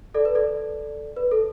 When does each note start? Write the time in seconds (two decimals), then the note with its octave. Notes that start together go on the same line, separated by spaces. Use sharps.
0.14 A4 D5
0.25 B4
0.35 A4 D5
1.16 B4
1.31 A4